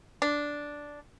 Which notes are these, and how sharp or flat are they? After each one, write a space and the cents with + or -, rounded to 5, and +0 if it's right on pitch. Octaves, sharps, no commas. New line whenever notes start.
D4 -5